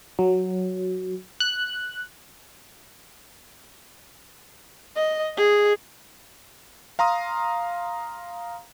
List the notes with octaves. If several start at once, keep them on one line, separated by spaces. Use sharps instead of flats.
F#3
F#6
D#5
G#4
F5 A#5 C6 D#6